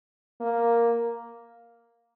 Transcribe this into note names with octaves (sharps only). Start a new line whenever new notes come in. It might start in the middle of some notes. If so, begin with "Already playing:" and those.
A#3